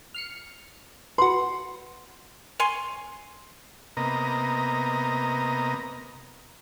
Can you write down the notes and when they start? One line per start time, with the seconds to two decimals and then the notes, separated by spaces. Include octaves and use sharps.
0.14 F6 C7 C#7
1.18 F#4 B4 C6
2.60 C#5 G#5 C6
3.97 C3 A#3 B3 D#5 A#5